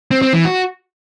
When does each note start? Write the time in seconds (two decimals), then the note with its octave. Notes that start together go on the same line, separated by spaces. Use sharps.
0.11 C4
0.22 C4
0.34 E3
0.45 F#4